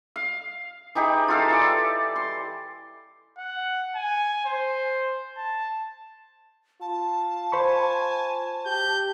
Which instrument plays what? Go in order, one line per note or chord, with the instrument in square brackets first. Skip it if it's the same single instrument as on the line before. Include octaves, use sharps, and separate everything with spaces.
[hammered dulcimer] F5
E3 D#4 G4 G#4
F4 G4 A4 F5
E3 D5
C6
[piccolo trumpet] F#5
G#5
C5
A5
[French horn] F4 [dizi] A5
[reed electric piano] C5 B5 C#6 [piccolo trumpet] G#5
[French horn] G4 [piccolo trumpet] G6